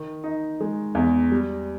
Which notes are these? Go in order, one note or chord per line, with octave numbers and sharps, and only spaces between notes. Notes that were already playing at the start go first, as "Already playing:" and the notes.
Already playing: D#3
D#4
G#3
E2
G3